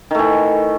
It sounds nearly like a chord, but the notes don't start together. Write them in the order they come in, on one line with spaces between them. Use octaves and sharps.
D#3 A3 E3